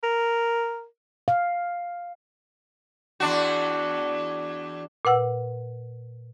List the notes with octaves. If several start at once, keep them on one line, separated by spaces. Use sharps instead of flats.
A#4
F5
E2 D4 F#4
A#2 B4 F#5 E6